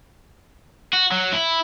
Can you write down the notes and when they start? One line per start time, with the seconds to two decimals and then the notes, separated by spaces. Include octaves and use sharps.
0.93 F#4
1.12 F#3
1.33 E4